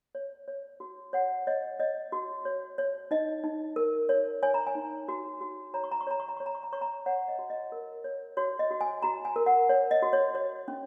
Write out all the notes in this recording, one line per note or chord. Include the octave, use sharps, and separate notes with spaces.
C#5
C#5
F#4
C#5 F#5
C#5 D#5
C#5 D#5
F#4
C#5
C#5
D#4 D#5
D#4
A#4
C#5
C#5 G#5
A#5
G#5
D#4
F#4
F#4
C#5 A#5
C#6
A#5
C#6
C#5 A#5
C#6
A#5
C#5 C#6
A#5
C#6
A#5
C#5 C#6
A#5
C#5 F#5
D#5
F#4
D#5
A#4
C#5
F#4 C#5
D#5
F#4
G#5
F#4 A#5
G#5
A#4
F#5
C#5
D#5
F#4
C#5
C#5
C#4